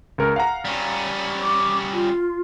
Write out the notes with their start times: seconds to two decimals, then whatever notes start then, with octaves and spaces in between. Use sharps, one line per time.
0.18 C#2 A#4
0.36 F5 F#5 A#5
0.65 G3 C#4
1.41 D6
1.93 F4